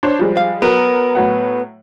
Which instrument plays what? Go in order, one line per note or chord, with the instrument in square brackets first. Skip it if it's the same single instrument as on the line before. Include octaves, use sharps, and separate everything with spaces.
[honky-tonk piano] D4 C5 C#5
F3 G3 G#3
[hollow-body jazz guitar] F5
[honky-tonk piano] F#3 A#4 [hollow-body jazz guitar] B3
[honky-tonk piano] A2 F#3 F#5